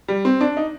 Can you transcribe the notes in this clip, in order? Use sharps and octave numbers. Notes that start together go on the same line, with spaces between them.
G3
C4
D4
D#4